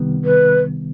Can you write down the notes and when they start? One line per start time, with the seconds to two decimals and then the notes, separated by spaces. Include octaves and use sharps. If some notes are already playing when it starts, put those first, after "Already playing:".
Already playing: C2 C3 D#3 G3 B3
0.24 B4